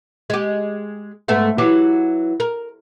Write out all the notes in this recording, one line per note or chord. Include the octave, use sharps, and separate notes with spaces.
G#3 G4
G#2 A3 B3
E3 F#3 G4
A#4